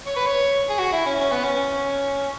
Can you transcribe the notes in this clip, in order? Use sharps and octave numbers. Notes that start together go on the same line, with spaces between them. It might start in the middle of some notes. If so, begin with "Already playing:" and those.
C#5
B4
C#5
G#4
F#4
E4
C#4
C#4
B3
C#4